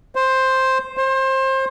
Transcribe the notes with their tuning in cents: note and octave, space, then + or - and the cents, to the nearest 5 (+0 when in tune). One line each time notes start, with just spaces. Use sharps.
C5 +5
C5 +25